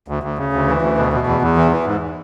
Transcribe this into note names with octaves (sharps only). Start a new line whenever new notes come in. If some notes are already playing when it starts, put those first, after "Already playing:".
D2
D2
C#3
D2
E3
D2
B2
B2
E2
E2
E3
E3
G#2